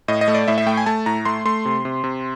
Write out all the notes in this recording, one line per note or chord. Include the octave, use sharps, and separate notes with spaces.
A2 D#5
D#5
A3
D5
A2 E5
E5
A3 G5
G#5
A3 A5
A2 A#5
A3 C6
A3 C6
C3
C3
C3